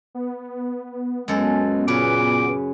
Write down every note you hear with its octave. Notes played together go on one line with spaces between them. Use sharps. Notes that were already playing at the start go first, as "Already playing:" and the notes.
B3
F#2 G#3 A4
A#2 C#3 B4 D6